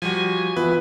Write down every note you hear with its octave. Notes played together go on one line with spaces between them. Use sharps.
F3 G3 F#4 G#5
E3 B3 F4 B4